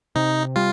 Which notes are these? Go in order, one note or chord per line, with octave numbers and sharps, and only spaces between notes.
C3 D#4
G3 F4